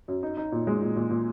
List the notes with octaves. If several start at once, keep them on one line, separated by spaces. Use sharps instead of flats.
F#2
D#4
D#4
A#2
G#3
A#2
A#2
A#2